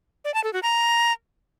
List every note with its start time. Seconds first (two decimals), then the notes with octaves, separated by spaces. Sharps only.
0.25 D5
0.34 A5
0.44 A4
0.53 F#4
0.63 A#5